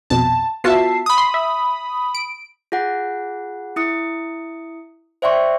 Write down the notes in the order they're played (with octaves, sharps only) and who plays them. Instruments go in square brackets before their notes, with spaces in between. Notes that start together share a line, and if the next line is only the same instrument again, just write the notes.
[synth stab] A#1 F2 B2 [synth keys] A5
[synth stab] B3 F4 F#4 [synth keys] E5 A5 C7
[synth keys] B5 D#6
[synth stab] C6
E5
D7
[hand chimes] F4 G#4 F#5
E4 D#6 C#7
C5 D5 E5 G5 C6 C#6